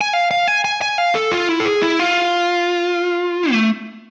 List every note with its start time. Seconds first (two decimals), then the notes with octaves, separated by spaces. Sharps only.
0.01 G#5
0.13 F5
0.31 F5
0.48 G#5
0.65 G#5
0.82 G#5
0.98 F5
1.15 A4
1.32 F4
1.49 E4
1.60 A4
1.65 G#4
1.82 E4
1.99 F4
3.52 A3